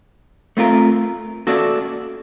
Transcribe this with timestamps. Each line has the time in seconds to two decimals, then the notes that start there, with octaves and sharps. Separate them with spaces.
0.57 A3 C4 F4 A#4
1.47 A#3 C#4 F#4 A4 D5